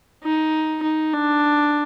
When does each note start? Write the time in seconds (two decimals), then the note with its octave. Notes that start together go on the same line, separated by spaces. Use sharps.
0.24 D#4
0.83 D#4
1.13 D4